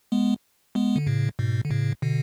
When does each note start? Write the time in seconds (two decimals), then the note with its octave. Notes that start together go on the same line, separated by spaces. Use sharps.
0.12 G#3 B3
0.75 G#3 B3
0.96 D3
1.07 A2 C#3
1.39 G#2 B2
1.65 D3
1.70 A2 C#3
2.02 B2 D3